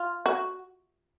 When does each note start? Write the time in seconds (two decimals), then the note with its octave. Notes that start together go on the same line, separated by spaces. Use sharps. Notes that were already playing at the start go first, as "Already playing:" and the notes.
Already playing: F4
0.26 F#4